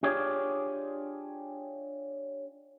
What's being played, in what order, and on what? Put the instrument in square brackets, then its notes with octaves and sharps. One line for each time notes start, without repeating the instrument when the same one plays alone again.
[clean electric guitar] D4 F4 G4 G#4 C#5 D5